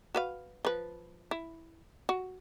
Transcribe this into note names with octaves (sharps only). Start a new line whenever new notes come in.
F#4 B4 F5
F3 B4
E4
F#4